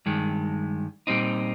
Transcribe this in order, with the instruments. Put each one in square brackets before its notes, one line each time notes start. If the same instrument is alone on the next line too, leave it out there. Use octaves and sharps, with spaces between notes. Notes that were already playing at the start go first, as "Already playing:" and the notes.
[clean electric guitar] G2 D#3 G#3
A#2 G3 C4 D#4